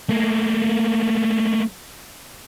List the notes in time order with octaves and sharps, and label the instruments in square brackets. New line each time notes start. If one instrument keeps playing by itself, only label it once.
[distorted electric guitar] A3 A#3